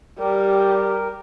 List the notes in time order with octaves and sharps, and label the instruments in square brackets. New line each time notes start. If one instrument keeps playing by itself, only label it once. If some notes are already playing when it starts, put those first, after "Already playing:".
[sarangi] G3 [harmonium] G4 A#4